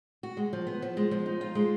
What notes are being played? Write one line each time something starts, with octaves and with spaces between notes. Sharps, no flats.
F#4
G#3
F3
B3
F3
G#3
F3
D#4
F4
G#3